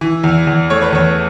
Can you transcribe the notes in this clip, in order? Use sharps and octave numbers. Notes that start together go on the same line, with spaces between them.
E3
E2
E2
A3 C#5
B4
E2 C#5